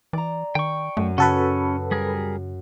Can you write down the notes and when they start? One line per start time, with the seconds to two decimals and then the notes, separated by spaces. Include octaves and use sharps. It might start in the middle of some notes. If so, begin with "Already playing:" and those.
0.13 E3 D5 A#5
0.55 D#3 G5 C#6
0.97 F#2 A3 D#7
1.18 C#3 C#4 F#4 A4 B4
1.91 G3 G#4 A#4